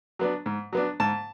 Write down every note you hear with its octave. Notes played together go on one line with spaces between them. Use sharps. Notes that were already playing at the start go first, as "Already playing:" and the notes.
F#3 B3 D4
G#2
F#3 B3 D4
G#2 A5